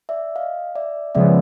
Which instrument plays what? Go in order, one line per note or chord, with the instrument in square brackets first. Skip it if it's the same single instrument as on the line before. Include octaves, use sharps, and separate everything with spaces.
[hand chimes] D5 E5
D#5 F5
D5 E5
[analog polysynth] C#3 F3 G#3 B3 [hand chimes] D5 E5